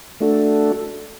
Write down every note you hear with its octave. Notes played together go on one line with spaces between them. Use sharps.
A3 D4 F#4 A4